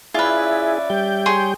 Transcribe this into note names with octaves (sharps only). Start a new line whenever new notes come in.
C#4 E4 F4 G#4 B4 D5 E5
G3 G5
G#4 C#5 C6